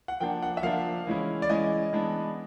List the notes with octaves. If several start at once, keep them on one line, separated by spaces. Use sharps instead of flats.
F#5
F3 A#3 D4 G5
F#5
E5
F3 A#3 D4 F5
E3 G#3 C#4 E4
D5
E3 G#3 C#4 E4 D#5
E3 G#3 B3 D4